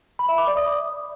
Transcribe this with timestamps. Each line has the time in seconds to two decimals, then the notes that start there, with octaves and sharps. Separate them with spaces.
0.19 B5
0.29 E5
0.38 D6
0.47 D5
0.57 D#6